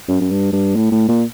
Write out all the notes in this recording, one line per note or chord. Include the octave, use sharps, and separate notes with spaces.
F#2
F#2
G2
G2
A2
A2
A#2